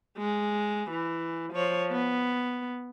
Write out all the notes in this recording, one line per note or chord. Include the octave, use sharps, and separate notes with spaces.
G#3
E3
F3 C#5
B3